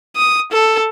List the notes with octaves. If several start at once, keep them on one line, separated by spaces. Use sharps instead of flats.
D#6
A4